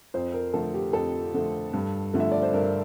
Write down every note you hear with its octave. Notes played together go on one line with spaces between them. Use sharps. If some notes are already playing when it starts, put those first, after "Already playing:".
F2 C5
A#4
D3 F3 A3 A4
G4
F2 A4
D3 F3 A3
G2
D3 F3 A3
E5
D5
C5
G2 A#4